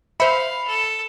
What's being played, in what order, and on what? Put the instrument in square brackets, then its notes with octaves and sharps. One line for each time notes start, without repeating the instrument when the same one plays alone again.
[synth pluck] C5 E5 [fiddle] F5 [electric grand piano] B5 C#7
[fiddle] A4